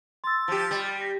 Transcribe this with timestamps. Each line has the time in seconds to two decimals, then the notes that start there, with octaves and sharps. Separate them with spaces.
0.24 C6 E6 A6
0.48 F3 G4
0.71 G3
1.01 A#6